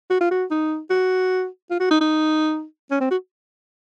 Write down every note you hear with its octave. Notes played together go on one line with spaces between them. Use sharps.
F#4
F4
F#4
D#4
F#4
F4
F#4
D#4
D#4
C#4
C4
F#4